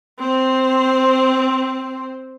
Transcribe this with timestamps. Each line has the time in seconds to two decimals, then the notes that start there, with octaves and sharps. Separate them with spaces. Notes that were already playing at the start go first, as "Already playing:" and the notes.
0.19 C4 C5